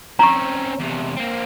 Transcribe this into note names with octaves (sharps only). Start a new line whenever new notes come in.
C4 C#4 A#5 C#6
E2 C3
A#3 C4